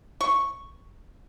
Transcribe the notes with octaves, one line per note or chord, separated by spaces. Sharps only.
C#6